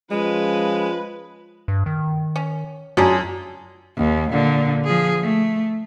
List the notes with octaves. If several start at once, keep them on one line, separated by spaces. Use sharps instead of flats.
F3 G#3 C#4 F4 B4
G2
D#3
C#4
F#2 C#4 D4 F4 G#4
D#2
A#2 D3
F3 G#4
A3